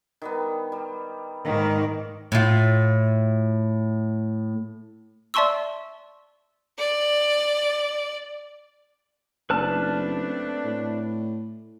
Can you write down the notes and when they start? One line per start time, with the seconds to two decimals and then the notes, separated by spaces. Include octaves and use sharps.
0.22 D#3 G3 B3
0.72 G3
1.45 G#2 D#3 A#3
2.32 A2 F4
5.34 D5 E5 A5 C6 C#6 E6
6.78 D5
9.50 F#1 A3 C4 D4 B4 A5 F6
10.64 A2